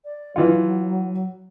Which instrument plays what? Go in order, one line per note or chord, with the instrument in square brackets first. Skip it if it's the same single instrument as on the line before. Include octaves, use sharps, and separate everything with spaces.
[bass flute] D5
[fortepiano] E3 F4 [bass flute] F#3